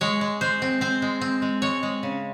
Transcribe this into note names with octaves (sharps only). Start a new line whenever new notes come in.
G#3 C#5
G#3
G#3 C5
C4
C4 C5
G#3
C4
G#3
G#3 C#5
G#3
C#3